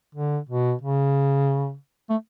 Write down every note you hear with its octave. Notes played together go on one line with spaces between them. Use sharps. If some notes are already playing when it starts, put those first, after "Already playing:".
D3
B2
C#3
A3